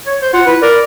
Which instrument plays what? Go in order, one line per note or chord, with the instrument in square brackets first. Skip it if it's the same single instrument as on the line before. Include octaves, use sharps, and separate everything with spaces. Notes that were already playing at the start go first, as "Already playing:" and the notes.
[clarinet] C#5
C5
[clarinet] F4 [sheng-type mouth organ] F#5
[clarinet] E4 [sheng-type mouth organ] B4
[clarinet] A#4 [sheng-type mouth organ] D5